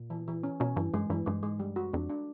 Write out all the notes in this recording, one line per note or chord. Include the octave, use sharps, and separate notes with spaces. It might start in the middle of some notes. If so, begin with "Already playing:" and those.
Already playing: A#2
E3
E3
C#4
B2 C#4
G2 E3
G2 G#3
G2 E3
G2 G#3
G#2 G#3
G2 G3
F#2 F#4
F2 D4
D4